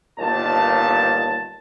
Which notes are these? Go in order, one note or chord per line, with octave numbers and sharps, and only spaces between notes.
G1 D#2 A#2 D#4 A5